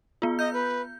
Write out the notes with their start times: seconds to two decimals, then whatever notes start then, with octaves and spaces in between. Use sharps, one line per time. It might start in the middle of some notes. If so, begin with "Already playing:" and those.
0.22 B3 F4
0.39 D#5 G6
0.53 B4